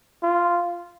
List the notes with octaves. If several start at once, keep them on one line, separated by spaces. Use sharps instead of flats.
F4